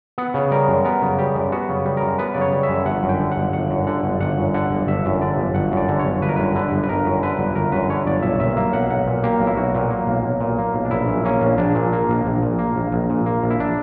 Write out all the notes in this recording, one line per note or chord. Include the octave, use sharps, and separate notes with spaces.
B3 F#5
C#3
G3 A#4
F#2
B3 A#4
C#3
G3 G4
F#2
B3 F#4
C#3
G3
A#4
F#2
B3 B4
C#3 D5
C#5
G3
E5
F#2
G1 F#5
F#2
G5
D3
F#5
G1
G1 F#5
F#2
D3 F#5
G1
G1 F#5
F#2
D3 F#5
G1
G1 E5
F#2
D3 D5
G1
G1 F#5
F#2 D5
D3
G1 C#5
G1 B4
A#4
F#2 B4
D3 B4
G1
B4
G1 A#4
F#2
D3 B4
G1
G1 A#4
F#2 B4
D3 C#5
G1 D5
B1 E5
A#2 E5
A#3 E5
B1 F#5
B1 F#5
A#2
A#3 G4
B1
E4
B1 F#4
A#2
A#3
B1
B1
A#2
A#3
B1
D4
A#1 E4
A#2
A#3 C#4
A#1
A#1 D4
A#2
A#3
A#1
A#1
A#2
A#3
A#1
A#1
A#2
A#3
A#1
E4
D4